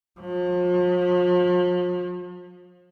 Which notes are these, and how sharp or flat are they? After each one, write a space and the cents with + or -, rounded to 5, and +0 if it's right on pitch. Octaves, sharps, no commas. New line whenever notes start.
F3 +40